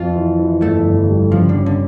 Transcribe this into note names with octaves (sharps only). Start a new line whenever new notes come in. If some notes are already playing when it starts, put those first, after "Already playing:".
Already playing: F2 F4
E3
E3
G1 A3
G1
G3
C#3 F3
D3
C#4
D3